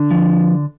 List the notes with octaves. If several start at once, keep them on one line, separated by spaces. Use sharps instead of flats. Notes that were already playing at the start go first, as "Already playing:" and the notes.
Already playing: D3 D4
F3